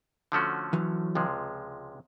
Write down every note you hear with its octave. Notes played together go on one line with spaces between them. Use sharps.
D3 F3 A3 C#4 F#4
E3 F#3
C#2 C3 F3 G#3